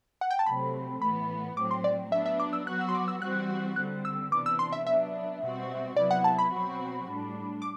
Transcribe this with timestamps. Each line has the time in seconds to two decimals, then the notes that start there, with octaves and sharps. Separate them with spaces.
0.21 F#5
0.31 G5
0.39 A5
0.46 C3 F#3 A3 C4 B5
1.02 A2 E3 B3 B5
1.57 A2 F#3 C4 D6
1.71 C6
1.84 D5
2.12 F#3 B3 D4 E5
2.26 E5
2.40 D6
2.53 E6
2.67 F#3 B3 F#4 F#6
2.81 E6
2.89 C6
2.94 D6
3.08 E6
3.21 E3 G3 C4 F#4 F#6
3.76 D3 G3 C4 F#6
4.05 E6
4.32 C3 E3 B3 D4 D6
4.46 E6
4.59 C6
4.72 E5
4.86 F#3 B3 D4 E5
5.41 B2 G3 C4 F#4
5.96 C3 F#3 B3 E4 D5
6.11 F#5
6.24 A5
6.39 B5
6.52 B2 F#3 C4 F#4
7.07 A2 G3 D4
7.62 D6